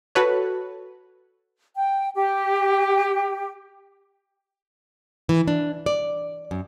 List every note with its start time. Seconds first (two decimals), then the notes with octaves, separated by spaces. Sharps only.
0.15 F#4 A4 B4 C#5
1.75 G5
2.13 G4
5.29 E3
5.48 D4
5.86 D5
6.51 F#2